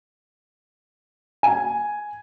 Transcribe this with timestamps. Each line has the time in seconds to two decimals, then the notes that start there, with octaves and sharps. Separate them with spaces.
1.43 G#5